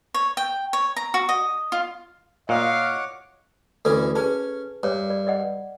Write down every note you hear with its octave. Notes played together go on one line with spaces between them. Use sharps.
C#5
G5
C#5
A#5
F#4
D#5
F4
A#2 F4 C#5 D#5 F5 F#5 D6
D2 E3 C#4 A4
C#4 G#4 B4 A5
G2 C#5
D5
D5 D#5 F#5